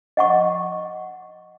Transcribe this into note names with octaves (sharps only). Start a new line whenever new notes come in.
D#5 F#5 C#6